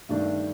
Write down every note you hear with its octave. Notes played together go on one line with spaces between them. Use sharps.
G2 D#3 A3 D4